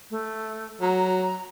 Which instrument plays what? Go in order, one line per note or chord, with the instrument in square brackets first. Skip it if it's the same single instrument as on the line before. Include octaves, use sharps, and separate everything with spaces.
[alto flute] A3
[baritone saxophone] F#3 [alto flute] A#5